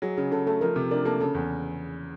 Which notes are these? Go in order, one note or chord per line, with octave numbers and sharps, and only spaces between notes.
F#3 G#4
C#3 G#4
C#3 A4
A3 A4
F3 A#4
C3
D4 A#4
A#3 A4
C#3 A4
E2